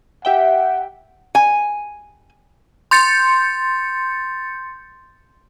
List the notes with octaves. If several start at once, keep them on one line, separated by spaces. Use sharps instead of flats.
G4 E5 F#5 G5
G#5
C6 G6 A6 C#7